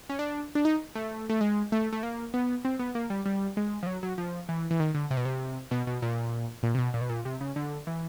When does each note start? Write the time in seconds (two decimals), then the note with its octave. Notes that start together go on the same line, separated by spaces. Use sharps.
0.10 C#4
0.19 D4
0.55 D4
0.65 D#4
0.95 A3
1.29 A3
1.41 G#3
1.72 A3
1.93 A3
2.03 A#3
2.34 B3
2.65 C4
2.79 B3
2.95 A#3
3.10 G3
3.26 G3
3.57 G#3
3.83 F3
3.87 F#3
4.03 F#3
4.18 F3
4.49 E3
4.71 E3
4.80 D#3
4.95 D3
5.11 C3
5.17 B2
5.25 C3
5.71 B2
5.87 B2
6.02 A#2
6.63 A#2
6.75 C3
6.78 B2
6.94 A#2
7.01 B2
7.09 A#2
7.25 C3
7.41 C#3
7.56 D3
7.87 E3